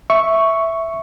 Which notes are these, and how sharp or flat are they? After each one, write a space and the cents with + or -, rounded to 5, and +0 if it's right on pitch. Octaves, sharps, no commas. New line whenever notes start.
E5 +0 C#6 +0